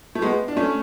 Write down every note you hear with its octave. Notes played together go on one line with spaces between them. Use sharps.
A3
G#3 B3
D4
A3 C#4